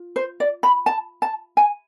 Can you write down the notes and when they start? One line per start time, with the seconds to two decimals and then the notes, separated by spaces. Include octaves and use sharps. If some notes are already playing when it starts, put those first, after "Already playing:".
Already playing: F4
0.16 C5
0.40 D5
0.63 B5
0.86 A5
1.22 A5
1.57 G#5